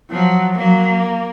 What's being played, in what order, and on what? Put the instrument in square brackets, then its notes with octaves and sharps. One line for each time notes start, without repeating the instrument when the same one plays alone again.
[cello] F3 [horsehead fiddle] F#3
[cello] F#3 [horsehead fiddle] A#3